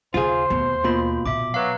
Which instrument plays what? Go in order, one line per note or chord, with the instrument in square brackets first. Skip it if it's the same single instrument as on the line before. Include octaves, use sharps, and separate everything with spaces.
[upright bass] D#2 C#3 [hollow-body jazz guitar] F4 G#4 [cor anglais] C5 [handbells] F5
[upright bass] D#2 A3 [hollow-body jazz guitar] B2
[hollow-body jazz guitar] B2 [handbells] A#3 F4 B5
[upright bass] A#2 B3 [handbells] E5 D6
[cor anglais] F#3 [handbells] B4 F5